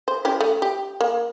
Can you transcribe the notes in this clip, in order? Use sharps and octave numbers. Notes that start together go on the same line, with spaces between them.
C5
C#4 E4 G4
A3
G4
A#3